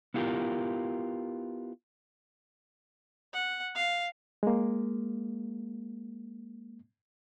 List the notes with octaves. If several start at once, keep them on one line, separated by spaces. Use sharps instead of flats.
B3 E4 F4 G4 A#4
F#5
F5
G#3 A#3